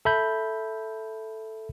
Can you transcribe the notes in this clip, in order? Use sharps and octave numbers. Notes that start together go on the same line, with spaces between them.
A4 E5 B5 G6